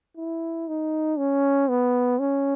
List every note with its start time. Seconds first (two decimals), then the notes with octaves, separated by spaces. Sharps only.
0.17 E4
0.68 D#4
1.18 C#4
1.69 B3
2.19 C#4